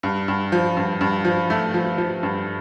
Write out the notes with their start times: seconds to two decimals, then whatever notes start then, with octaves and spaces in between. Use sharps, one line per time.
0.03 G2
0.28 G2
0.52 F3
0.77 G2
1.01 G2
1.25 F3
1.50 A3
1.74 F3
1.98 F3
2.23 G2